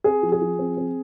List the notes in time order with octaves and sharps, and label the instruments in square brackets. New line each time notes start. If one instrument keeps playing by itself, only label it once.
[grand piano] C4 G#4
F3
G#4
F3
C4
C4